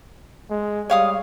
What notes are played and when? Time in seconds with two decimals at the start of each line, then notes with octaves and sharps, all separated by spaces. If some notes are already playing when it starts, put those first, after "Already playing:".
0.50 G#3
0.90 G3 C#5 F5 D#6